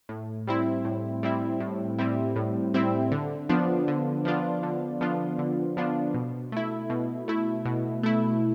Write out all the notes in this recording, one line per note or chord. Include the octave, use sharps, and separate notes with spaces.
A2
G3 C4 E4
A2
G3 C4 E4
A2
G3 C4 E4
A2
G3 C4 E4
D3
F3 B3 D4 F4
D3
F3 B3 D4 F4
D3
F3 B3 D4 F4
D3
F3 B3 D4 F4
B2
A3 E4
B2
A3 E4
B2
A3 E4